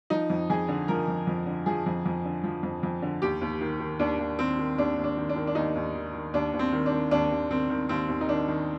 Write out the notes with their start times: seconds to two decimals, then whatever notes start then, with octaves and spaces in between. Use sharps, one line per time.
0.10 F3 D#4
0.30 F2
0.50 F2 G#4
0.68 D3
0.88 F3 A#4
1.08 F2
1.27 F2
1.47 D3
1.66 F3 G#4
1.86 F2
2.06 F2
2.25 D3
2.44 F3
2.63 F2
2.83 F2
3.02 D3
3.22 D#2 G4
3.41 D#2
3.61 D#3
3.80 D#3
3.99 D#2 D4
4.19 D#2
4.39 D#3 C4
4.59 D#3
4.78 D#2 D4
4.98 D#2
5.04 D4
5.17 D#3
5.29 D4
5.36 D#3
5.47 D4
5.55 D#2 D#4
5.76 D#2
5.95 D#3
6.14 D#3
6.34 D#2 D4
6.53 D#2
6.59 C4
6.72 D#3
6.86 D4
6.92 D#3
7.11 D#2 D4
7.31 D#2
7.51 D#3 C4
7.70 D#3
7.89 D#2 C4
8.08 D#2
8.21 D#4
8.29 D#3 D4
8.48 D#3